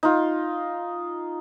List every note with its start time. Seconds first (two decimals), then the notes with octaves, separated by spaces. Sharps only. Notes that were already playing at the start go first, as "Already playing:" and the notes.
0.03 D#4 F4